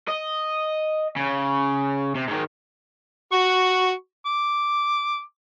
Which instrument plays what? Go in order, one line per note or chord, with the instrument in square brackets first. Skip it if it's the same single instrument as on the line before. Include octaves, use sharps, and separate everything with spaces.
[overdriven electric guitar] D#5
C#3
C3
G#2 D#3
[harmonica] F#4 C#6
D6